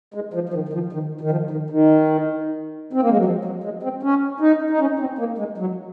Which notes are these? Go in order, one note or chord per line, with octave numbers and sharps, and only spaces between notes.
G#3
F3
F3
D#3
D#3
F3
D#3
D#3
F3
D#3
D#3
C4
A#3
G#3
F#3
F3
F#3
G#3
C4
C#4
D#4
D#4
C#4
C4
A#3
G#3
F#3